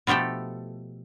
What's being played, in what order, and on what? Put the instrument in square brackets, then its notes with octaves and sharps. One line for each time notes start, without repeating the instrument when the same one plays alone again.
[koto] B2 F3 A3 G4 A4